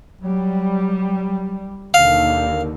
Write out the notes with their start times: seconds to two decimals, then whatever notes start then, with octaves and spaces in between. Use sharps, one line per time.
0.21 F#3 G3
1.94 D#2 B2 D3 D#3 F5